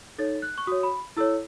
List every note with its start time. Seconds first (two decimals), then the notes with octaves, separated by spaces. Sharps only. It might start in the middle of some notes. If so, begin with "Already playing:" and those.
0.18 D#4 A4 C#5 A6
0.42 F#6
0.58 C#6
0.67 F#4 C#5 D#6
0.83 B5
1.17 E4 A4 C#5 E6